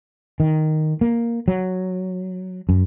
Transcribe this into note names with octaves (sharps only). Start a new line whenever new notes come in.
D#3
A#3
F#3
F#2